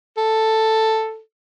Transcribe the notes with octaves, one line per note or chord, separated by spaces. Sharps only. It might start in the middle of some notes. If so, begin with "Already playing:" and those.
A4